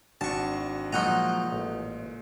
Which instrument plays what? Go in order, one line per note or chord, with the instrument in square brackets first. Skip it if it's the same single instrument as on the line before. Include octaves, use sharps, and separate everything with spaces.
[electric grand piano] G#1 D4 F#4 [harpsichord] A5 C#6
[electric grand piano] A#2 G#3 [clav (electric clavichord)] F3 F#3 D#5 [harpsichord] D#4 F#5 A#5
[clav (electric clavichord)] A1